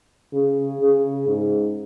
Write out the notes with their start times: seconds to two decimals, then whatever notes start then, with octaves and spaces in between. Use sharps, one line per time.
0.33 C#3
0.81 C#3
1.28 G#2